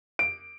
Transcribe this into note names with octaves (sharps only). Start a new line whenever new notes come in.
D7